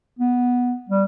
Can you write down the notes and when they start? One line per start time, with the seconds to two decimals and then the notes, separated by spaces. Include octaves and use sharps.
0.19 B3
0.89 G3